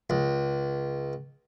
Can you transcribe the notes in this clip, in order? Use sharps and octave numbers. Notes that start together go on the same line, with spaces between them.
C#2